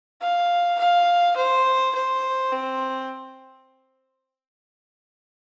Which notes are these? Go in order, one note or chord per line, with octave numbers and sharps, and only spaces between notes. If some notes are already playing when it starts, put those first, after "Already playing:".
F5
F5
C5
C5
C4